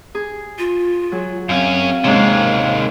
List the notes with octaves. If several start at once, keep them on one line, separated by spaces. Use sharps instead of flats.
G#4
F4
F#3 G#4
F#2 C4 C#4 F5
D#2 G#2 C3 G#3 C#4